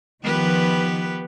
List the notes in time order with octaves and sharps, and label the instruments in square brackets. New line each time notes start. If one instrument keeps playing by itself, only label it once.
[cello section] D#3 F3 [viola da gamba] B3 G4 B4